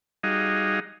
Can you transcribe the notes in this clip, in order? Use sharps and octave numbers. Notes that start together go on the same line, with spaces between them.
G3 D#4 F#4 G#4 D#5 F5